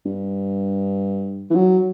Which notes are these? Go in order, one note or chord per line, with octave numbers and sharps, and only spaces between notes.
G2
E3
F#3